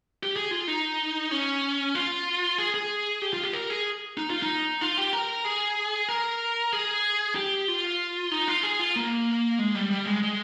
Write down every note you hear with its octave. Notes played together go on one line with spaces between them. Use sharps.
G4
G#4
F4
D#4
C#4
F4
G#4
G#4
G4
F4
G4
A#4
G#4
D#4
F4
D#4
F4
G4
A#4
G#4
A#4
G#4
G4
F4
D#4
F4
G#4
F4
A#3
G#3
G3
G3
G#3
G#3